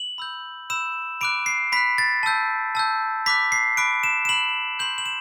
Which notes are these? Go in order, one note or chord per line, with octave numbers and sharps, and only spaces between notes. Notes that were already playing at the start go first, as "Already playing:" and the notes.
Already playing: F#7
B5 E6 G6
B5 E6 G6 E7
B5 D6 F#6 D7
C7
B5 F#6 B6
A6
A5 E6 G6
A5 E6 G6
B5 D6 F#6 B6
C7
B5 D6 F#6 D7
E7
E7
B5 F#6 F#7
C6 G6 F#7
F#7
E7